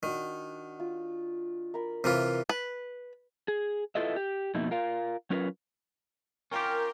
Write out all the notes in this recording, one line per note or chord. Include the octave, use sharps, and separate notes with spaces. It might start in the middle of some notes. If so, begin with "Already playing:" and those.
D#3 D4 F#4
F4
A#4 B5
C3 E3 F4 A#4
B4
G#4
E4 F4 A4 B4 D#5 E5
G4
F2 B2 A#3 D#4 E4
F4 A#4 F5
F#3 C#4 F4 A#4 B4
C#4 F4 G4 A#4 G5